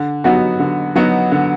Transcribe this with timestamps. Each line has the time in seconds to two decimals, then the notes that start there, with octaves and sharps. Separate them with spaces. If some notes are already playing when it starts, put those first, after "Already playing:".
Already playing: D3
0.24 F#3 B3 D#4 F#4
0.60 D3
0.96 F#3 B3 D#4 F#4
1.32 D3